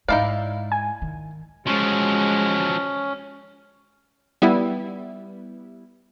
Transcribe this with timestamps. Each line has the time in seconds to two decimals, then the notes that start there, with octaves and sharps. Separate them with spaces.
0.08 G#2 G#3 D#4 E4 D5 F5
0.72 G#5
1.02 D#3
1.67 F3 F#3 G#3 C#4
4.42 G3 B3 E4